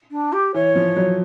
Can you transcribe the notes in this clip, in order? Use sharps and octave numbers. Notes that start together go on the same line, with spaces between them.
D4
G4
E3 C#5
F3
F#3